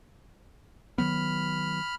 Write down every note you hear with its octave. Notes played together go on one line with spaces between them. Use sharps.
D#3 F#3 B3 B5 F6